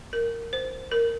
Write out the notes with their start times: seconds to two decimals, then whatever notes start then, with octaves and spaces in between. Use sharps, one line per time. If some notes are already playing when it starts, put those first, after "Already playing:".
0.13 A#4
0.53 C5
0.92 A#4